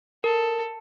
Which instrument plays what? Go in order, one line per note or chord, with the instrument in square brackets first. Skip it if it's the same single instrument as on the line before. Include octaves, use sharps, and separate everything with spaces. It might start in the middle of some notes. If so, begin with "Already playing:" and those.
[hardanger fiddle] A4 [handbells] A#4